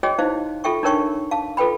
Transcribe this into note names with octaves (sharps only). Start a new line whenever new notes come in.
F#4 G#4 C#5 D#5 G5
D#4 E4 C5 D#5 F5
F4 A4 E5 G5 C#6
D4 D#4 A#4 C#5 G5 C#6
F5 A5
F4 A4 B4 G5 B5